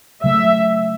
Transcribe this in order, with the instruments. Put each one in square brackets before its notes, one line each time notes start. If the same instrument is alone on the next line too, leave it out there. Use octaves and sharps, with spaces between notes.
[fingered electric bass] C#3 F#3 A3 [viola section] E5